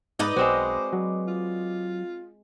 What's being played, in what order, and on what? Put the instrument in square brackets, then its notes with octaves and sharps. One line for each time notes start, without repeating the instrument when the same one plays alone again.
[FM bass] G#2 [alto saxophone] D#4 [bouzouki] B4 D5 D#5
[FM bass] B1 [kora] G#3 C4 F#4 [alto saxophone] C5
[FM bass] F#3
[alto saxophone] F4